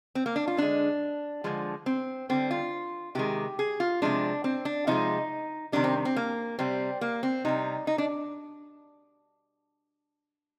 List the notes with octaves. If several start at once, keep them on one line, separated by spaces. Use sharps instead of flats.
C4
A#3
D4
F4
D3 G#3 D4
D3 F3 G#3
C4
D3 G3 C4
F4
C3 D#3 G#3 G4
G#4
F4
C3 F3 G#3 D4
C4
D4
C3 F3 G#3 D#4
C3 D#3 G3 D4
C4
C4
A#3
C3 G3 C4
A#3
C4
C3 G3 D#4
D#4
D4